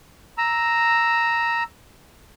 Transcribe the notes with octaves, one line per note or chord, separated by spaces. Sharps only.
A#5 E6